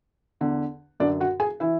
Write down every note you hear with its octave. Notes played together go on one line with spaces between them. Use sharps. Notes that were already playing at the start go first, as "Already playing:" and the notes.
E2 D3
F#2 D3 D4 D5
F#4 F#5
G#4 G#5
E3 E4 E5